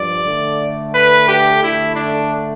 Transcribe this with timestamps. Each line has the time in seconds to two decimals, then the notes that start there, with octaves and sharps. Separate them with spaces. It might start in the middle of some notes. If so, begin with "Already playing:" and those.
Already playing: G2 F3 D5
0.26 D3 A3
0.93 B4
1.28 G4
1.62 D3 A3 E4
1.95 D4